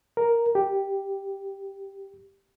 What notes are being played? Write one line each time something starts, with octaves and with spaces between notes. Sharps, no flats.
A#4
G4